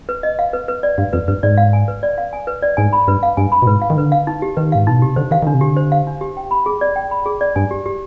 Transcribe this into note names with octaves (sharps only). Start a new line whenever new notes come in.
B4
D#5
F5
B4
B4
D5
G2 F5
F2 B4
G2 B4
G#2 D5
F5
G#5
B4
D5
F5
G#5
B4
D5
G#2 G#5
B5
G2 B4
F5
G2 G#5
B5
B2
G#2 B4
F5
D#3
D3 B4
F5
D#4
G4
D#3 B4
G#2 F5
B2 D#4
C3 G4
D3 C5
D#3 F5
D#3
D3 D4
C3
D3 G4
C5
F5
D4
G4
G5
B5
G#4
D5
G5
B5
G#4
D5
G2 G#5
G4
G4